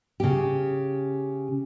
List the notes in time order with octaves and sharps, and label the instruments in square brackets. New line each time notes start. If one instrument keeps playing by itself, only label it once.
[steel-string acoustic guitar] C#3 G4